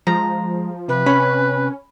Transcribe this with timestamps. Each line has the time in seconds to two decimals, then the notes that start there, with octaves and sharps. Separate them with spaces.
0.07 F3 G#3 A#5
0.88 C3 B4
1.06 C#4 B5